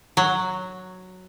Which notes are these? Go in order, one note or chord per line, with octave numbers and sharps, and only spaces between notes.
F#3